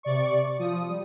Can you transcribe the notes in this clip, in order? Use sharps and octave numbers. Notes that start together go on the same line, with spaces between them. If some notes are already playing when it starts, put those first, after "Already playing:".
C3 D5 C#6
F3 D#6
G3